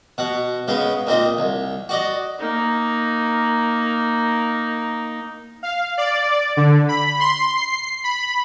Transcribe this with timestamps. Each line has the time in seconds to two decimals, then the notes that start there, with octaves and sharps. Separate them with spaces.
0.18 B2 F#5
0.68 C#3 G#3 B3
1.07 A#2 C4 D#4
1.38 C2
1.89 F#4 D5 D#5
2.40 A#3 D#4
5.63 F5
5.98 D5
6.57 D3
6.89 B5
7.20 C6
7.56 C7
8.04 B5